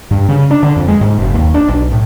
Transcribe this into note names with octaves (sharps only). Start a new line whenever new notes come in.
G2
C#3
D4
D3
F2
G#3
G#2
F#1
D#2
D4
B1
A2